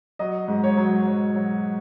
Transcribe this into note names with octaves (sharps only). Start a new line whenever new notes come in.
F#3 D#5
G#2
C#5
F#3
F#3
F#3